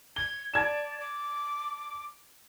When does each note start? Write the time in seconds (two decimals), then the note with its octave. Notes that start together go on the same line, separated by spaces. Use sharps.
0.16 G#6 G7
0.54 D5 A5 G#6 E7
1.00 D6